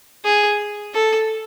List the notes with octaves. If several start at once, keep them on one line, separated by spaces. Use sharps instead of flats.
G#4
A4